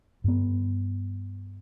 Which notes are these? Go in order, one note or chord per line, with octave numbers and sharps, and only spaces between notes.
G2 B3